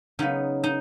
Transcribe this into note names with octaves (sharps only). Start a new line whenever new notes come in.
C#3 F#3 B3 D#4
D#4